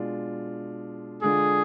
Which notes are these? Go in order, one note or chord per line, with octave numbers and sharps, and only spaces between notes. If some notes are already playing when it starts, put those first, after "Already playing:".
Already playing: B2 G#3 D4 F4
D3 G#3 D4 F4 G#4